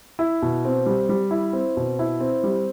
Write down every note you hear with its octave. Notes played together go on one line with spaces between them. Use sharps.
E4
B2
C4
G3
G3
E4
C4
B2
E4
C4
G3